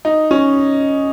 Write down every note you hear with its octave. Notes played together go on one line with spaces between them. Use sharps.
D#4
C#4